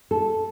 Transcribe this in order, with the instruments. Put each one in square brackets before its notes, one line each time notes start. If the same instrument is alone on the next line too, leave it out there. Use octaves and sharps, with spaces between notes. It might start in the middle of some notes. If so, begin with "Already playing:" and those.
[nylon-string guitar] A4